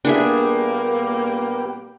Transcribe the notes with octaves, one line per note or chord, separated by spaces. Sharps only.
A#2 G3 A#3 B3 D4 G4 G#4 E5